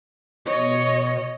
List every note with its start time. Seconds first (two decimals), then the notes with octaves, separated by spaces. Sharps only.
0.46 B2 C#5 D#5